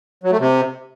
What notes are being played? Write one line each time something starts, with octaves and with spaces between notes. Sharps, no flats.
F#3
A3
C3